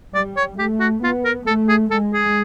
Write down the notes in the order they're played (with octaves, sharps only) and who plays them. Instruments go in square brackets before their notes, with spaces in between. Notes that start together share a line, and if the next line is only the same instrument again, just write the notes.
[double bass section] G3 [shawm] D5
[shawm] C#5
[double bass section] A3 [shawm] G4
[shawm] F#4
[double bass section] B3 [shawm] F4
[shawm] A#4
[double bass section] A3 [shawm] A4
[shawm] G#4
[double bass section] G#3 [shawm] A4
[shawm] G#4